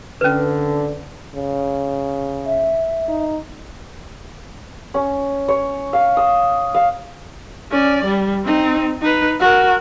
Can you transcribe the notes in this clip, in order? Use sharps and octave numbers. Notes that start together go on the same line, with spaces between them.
D3 C#4 B4
C#3
E5
D#4
C#4
C#5
F5
D#6
F5
C#4 D5
G3
C4 D#4
D#4 B4
F#4 A#4